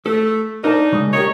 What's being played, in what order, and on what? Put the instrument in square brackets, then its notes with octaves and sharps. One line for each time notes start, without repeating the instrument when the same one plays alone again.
[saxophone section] A3 [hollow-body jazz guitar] A4
[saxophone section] D4 D#4 [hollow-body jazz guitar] A#4 C5 A5
[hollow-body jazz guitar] C#3 G#3
[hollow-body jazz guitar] G4 A#4 D#5 [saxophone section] C#5